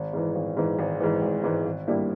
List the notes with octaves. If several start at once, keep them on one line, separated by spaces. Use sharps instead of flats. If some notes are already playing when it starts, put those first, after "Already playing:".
Already playing: G#1
G#2 E3
G#1
G#2 E3
G#1
G#2 E3
G#1
G#2 E3
G#1
G2 G3 A#3 E4